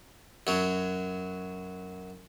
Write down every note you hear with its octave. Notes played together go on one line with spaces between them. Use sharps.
F#2 F#3